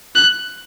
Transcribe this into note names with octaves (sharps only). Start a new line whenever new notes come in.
F#6